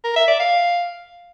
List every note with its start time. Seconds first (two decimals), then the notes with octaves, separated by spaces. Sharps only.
0.04 A#4
0.16 E5
0.28 D5
0.39 F5